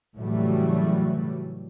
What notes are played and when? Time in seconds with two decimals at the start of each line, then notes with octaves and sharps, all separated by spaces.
0.16 A2 C#3 E3 F#3 G3 A3